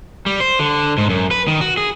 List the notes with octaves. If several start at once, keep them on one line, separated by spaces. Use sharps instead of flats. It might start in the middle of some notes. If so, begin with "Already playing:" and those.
G3
C5
D3
G#2
F#2
B4
D#3
F#4
G#4